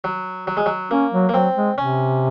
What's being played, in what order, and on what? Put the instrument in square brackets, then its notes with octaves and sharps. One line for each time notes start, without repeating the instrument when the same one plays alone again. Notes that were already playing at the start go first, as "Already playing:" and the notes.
[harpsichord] F#3
F#3
G#3
F#3
[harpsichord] A#3 [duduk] C#4
[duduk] F#3
[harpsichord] A#3
[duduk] F#3 [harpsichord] C4
[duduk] G#3
[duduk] C3 [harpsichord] C#4